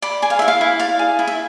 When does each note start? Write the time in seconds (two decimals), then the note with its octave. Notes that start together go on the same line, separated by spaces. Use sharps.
0.02 D5 B5
0.22 G#4 G#5
0.30 F5
0.39 E4 E5
0.48 F5
0.61 E4
0.79 D5 F5
0.99 G#4
1.19 E4
1.27 E5